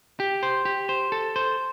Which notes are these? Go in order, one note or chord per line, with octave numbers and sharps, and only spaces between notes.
G4
C5
G4
C5
A4
C5